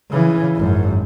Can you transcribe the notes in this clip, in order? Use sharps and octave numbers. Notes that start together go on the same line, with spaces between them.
C#3 E3
G#1 F#2